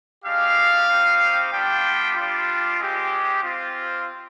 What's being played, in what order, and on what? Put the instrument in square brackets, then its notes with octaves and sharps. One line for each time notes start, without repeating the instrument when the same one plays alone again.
[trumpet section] G#3 D4 G4 F5
C4 D#4 G4
G3 B3 D4 F4 G5
G3 D4 F4
G#3 C4 G4
C4 F4